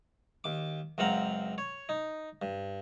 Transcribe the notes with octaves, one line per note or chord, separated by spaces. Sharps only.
D#2 D6
C#2 F#2 C4 F5 F#5 A#5
C#5
D#4
G2